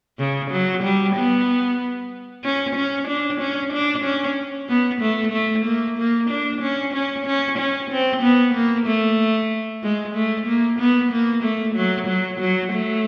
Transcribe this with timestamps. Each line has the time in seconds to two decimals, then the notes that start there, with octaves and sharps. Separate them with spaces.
0.19 C#3
0.52 F#3
0.84 G3
1.16 B3
2.45 C#4
2.76 C#4
3.08 D4
3.41 C#4
3.73 D4
4.05 C#4
4.69 B3
5.02 A3
5.33 A3
5.66 A#3
5.98 A#3
6.30 D4
6.61 C#4
6.94 C#4
7.26 C#4
7.58 C#4
7.91 C4
8.23 B3
8.54 A#3
8.87 A3
9.83 G#3
10.16 A3
10.47 A#3
10.79 B3
11.12 A#3
11.44 A3
11.76 F#3
12.08 F#3
12.40 F#3
12.73 A3